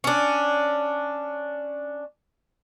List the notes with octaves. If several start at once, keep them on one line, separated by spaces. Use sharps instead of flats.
C#4 D4